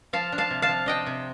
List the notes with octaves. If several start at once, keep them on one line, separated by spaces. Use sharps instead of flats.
F3 F5 A5
D4
F5 A5
C3
F5 A5
F3
D4 D#5 G5
C3